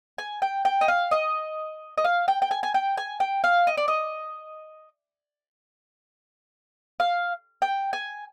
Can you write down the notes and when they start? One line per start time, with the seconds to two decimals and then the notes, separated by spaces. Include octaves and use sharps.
0.18 G#5
0.42 G5
0.65 G5
0.81 D#5
0.88 F5
1.11 D#5
1.98 D#5
2.05 F5
2.28 G5
2.42 G5
2.51 G#5
2.63 G#5
2.74 G5
2.98 G#5
3.20 G5
3.44 F5
3.67 D#5
3.77 D5
3.88 D#5
7.00 F5
7.62 G5
7.93 G#5